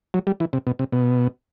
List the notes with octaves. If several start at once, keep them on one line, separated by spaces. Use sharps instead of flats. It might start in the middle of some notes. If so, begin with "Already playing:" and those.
F#3
G3
E3
C3
B2
C3
B2